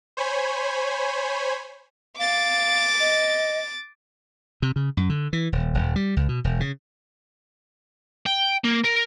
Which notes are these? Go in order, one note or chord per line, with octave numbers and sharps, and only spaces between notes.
C5 C#5 G#5 B5
F5 D6 A6
D#5
C3
C#3
F#2
D3
E3
D#1
D#1
G3
C#2
B2
E1
C#3
G5
A#3
A#4